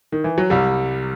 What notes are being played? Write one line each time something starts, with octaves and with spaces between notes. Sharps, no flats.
D#3
E3
F#3
C2 G3